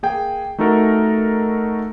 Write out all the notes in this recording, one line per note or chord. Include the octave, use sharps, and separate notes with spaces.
A#3 G#4 G5
A3 D#4 F#4 A4 A#4